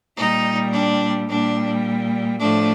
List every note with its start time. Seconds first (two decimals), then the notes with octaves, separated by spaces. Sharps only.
0.17 A#2 G3 D#4
0.73 D4
1.29 A#2 G3 D4
2.39 A2 F3 A3 D4